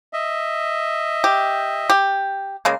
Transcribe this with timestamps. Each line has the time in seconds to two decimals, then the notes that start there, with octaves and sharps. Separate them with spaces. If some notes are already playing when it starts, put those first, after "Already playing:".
0.13 D#5 E5
1.24 G4
1.90 G4
2.65 C#3 G#3 A#3